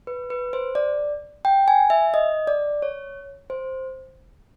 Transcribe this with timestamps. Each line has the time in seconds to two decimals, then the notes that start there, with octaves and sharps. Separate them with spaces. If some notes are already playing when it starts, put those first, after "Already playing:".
0.07 B4
0.30 B4
0.53 C5
0.75 D5
1.45 G5
1.68 G#5
1.90 E5
2.14 D#5
2.47 D5
2.82 C#5
3.50 C5